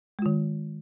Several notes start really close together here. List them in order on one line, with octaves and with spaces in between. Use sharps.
G#3 F4 D#3